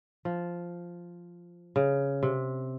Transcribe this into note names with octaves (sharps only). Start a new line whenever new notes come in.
F3
C#3
C3